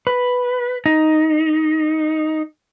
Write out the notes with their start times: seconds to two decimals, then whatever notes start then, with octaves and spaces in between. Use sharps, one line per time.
0.07 B4
0.86 D#4